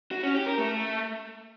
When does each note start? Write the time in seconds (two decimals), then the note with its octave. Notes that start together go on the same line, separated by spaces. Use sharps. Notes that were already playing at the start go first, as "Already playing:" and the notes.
0.11 F#4
0.23 C#4
0.35 G4
0.46 A#4
0.58 A3